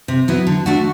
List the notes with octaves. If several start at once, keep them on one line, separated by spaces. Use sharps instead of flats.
C3
F#3 B3 E4
D3
A3 D4 F#4